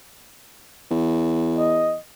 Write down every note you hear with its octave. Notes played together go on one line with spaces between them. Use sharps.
E2
D#5